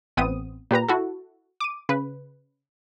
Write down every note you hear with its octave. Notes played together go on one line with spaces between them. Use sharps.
A1 B3 C4 D#6 D#7
A#2 G4 B4 A#5
E4 F#4 A4
D6 D#7
C#3 B4